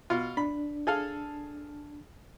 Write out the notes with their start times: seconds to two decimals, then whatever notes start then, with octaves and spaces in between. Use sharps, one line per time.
0.10 B2 F4
0.37 D4 B5
0.87 G#4 A4 F5